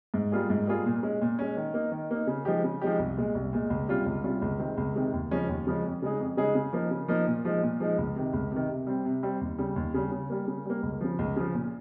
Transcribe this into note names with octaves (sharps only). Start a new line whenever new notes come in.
G#2
G3 A#3 F4 G#4
G#2
G3 A#3 F4 G#4
A#2
G#3 C#4
A#2
G#3 C#4
D#3
A#3 D#4
D#3
A#3 D#4
C#3
F3 G#3 D#4 G4
C#3
F3 G#3 D#4 G4
C2
A#2 G#3
C2
A#2 G#3
C#2
C3 G3 C#4 F4
C#2
C3 G3 C#4 F4
C#2
C3 D#3 G#3 C4
C#2
C3 D#3 G#3 C4
D#2
C#3 F3 G#3 C#4
D#2
C#3 F3 G#3 C#4
F2
C#3 G#3 D#4 G#4
F2
C#3 G#3 D#4 G#4
C#3
F3 A#3 D#4
C#3
F3 A#3 D#4
A#2
F3 G#3 D#4
A#2
F3 G#3 D#4
C#2
C3 D#3
C#2
C3 D#3
C3
G3 C4
C3
G3 C4
D#2
C#3 G3
D#2
C#3 G3
C#3
G3 A#3
C#3
G3 A#3
C#2
C#3 F3
C#2
C#3 F3
A#2